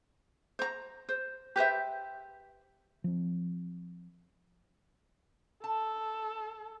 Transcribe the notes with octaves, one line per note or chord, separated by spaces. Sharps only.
C5 A#5
C5
G4 B4 C5 E5
F3 C4
A4 A5